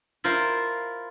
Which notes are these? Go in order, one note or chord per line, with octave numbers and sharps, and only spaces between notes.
E4 F4 A#4 C5